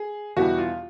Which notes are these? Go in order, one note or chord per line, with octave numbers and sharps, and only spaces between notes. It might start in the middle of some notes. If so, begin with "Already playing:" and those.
Already playing: G#4
E2 B2 G3 B3 E4 F#4
F4